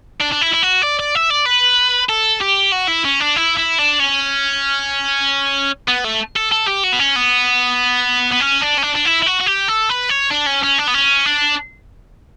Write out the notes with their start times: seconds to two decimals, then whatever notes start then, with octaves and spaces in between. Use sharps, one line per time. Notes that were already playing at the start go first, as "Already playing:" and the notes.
0.20 D4
0.32 D4
0.41 E4
0.53 E4
0.62 F#4
0.83 D5
0.99 D5
1.15 E5
1.30 D5
1.46 B4
2.09 A4
2.41 G4
2.72 F#4
2.88 E4
3.05 C#4
3.20 D4
3.36 E4
3.57 E4
3.78 D4
4.00 C#4
5.88 B3
6.04 A3
6.36 A4
6.52 A4
6.67 G4
6.83 F#4
6.92 B3
6.99 C#4
7.16 B3
8.32 B3
8.41 C#4
8.62 D4
8.78 C#4
8.83 D4
8.95 D4
9.05 E4
9.22 E4
9.26 F#4
9.40 F#4
9.46 G4
9.68 A4
9.89 B4
10.09 C#5
10.30 D4
10.46 C#4
10.63 C#4
10.78 D4
10.87 B3
10.94 C#4
11.26 D4